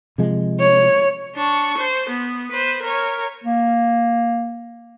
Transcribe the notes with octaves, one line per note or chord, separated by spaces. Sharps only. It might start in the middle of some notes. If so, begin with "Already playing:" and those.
C3 F3 G#3
C#5
D4 C#6
C5
B3
B4 C5
A#4 C#5
A#3